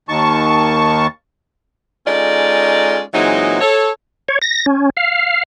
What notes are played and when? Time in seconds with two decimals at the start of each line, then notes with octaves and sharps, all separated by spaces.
0.09 D#2 D#3 A5 C#6
2.06 G#3 C#4 D#4 F4 A4 D5
3.14 A#2 E3 F#3 G#3 C4 D#4
3.61 A4 C#5
4.28 C#5
4.42 A#6
4.66 C#4
4.97 F5